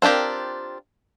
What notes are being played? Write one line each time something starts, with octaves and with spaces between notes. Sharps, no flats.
C4 D4 F4 G4 A#4